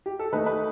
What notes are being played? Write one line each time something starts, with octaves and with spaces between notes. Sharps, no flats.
G4
A4
D#3 A3 D#4 B4
B4